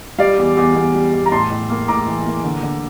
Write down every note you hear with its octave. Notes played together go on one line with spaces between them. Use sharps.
G3 D5 F5
E2
E2
E2
G3
E2
A#5
A2 A5 C6
A2
A#3
A2 A#5 D6
E3
A#3
D3
D3